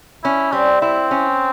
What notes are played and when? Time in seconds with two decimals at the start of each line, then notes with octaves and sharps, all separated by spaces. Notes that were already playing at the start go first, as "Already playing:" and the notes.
0.24 C#4 E4
0.52 G3 C4
0.82 C4 E4
1.11 C#4